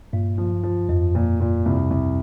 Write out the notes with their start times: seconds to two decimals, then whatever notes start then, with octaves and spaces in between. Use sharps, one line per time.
0.13 G2 A#2
0.38 F3
0.63 F3
0.89 F2 F3
1.15 A#2
1.41 A#2
1.66 C2
1.90 C2